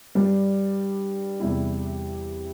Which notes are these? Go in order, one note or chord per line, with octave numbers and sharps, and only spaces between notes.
G2 G3 D4
E2 C3 G3 E4